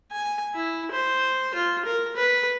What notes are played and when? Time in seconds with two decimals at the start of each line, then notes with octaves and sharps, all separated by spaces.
0.12 G#5
0.55 E4
0.92 C5
1.54 F4
1.85 A#4
2.16 B4